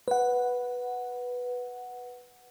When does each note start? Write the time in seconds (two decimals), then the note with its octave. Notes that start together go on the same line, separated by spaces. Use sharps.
0.08 B4 F#5